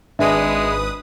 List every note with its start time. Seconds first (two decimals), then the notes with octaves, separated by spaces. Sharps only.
0.19 G#1 G#3 D4 B4 E5 D#6